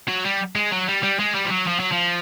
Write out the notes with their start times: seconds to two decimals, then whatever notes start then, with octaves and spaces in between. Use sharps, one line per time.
0.08 F#3
0.25 G3
0.56 G#3
0.71 F#3
0.88 G3
1.03 G3
1.20 G#3
1.35 G3
1.45 F3
1.50 F#3
1.67 F3
1.80 F#3
1.92 F3